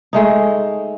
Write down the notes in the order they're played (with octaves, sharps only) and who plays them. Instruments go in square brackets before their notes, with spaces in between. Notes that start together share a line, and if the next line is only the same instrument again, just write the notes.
[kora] G#3 A3 D#4